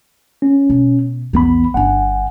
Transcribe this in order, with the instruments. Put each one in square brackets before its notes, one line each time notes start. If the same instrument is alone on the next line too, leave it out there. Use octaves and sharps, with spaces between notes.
[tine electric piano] C#4
[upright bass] B2
[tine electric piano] A#1 B3 B5 [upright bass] E2 E3
[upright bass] G1 D4 [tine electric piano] F#5 G#5